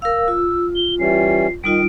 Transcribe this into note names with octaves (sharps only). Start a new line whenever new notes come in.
A#4 F5 E6
F4
G7
E3 G3 C#4 C7
D#3 G3 D#4 F4 D7